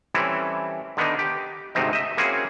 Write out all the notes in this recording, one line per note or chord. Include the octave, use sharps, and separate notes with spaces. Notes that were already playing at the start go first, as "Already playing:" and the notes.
E3 G3 A3 C4 C#4 E4
D3 D#3 B3 D4 D#4
G4
D2 G#2 C3 A3 C4 D#4
D#5 E5
A#3 C4 C#4 E4 F#4 G#4